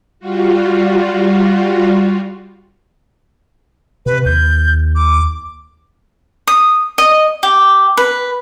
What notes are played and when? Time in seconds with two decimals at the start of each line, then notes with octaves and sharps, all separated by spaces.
0.19 G3 F4 F#4
4.06 C3 B4
4.26 D#2 G6
4.95 D6
6.47 D#6
6.98 D#5
7.43 G4
7.97 B4